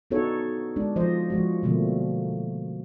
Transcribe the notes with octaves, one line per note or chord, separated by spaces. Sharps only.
B3 D4 D#4 F#4 A4 C#5
G#3 D4
F3 C5 D#5
F3 G#3 F#4
B2 D3 F3 G3 A3 A#3